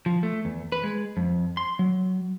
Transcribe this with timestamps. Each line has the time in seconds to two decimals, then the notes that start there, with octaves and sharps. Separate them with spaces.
0.06 F3
0.23 A3
0.45 E2
0.72 B4
0.84 G#3
1.17 F2
1.57 C6
1.79 F#3